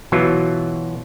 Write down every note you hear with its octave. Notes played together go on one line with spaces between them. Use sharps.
B2 E3 F#3 F4